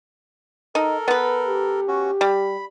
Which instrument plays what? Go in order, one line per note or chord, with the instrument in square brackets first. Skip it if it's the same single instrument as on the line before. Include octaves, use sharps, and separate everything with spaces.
[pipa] D#4 [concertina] A4 A#4
[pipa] B3 B4
[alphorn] G4
[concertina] C#4 F#4
[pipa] G3 [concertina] B5